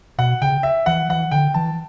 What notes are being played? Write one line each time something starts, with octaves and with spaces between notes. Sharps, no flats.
B2 F#5
C#3 G5
E5
E3 F#5
E3 F#5
D3 G5
E3 A5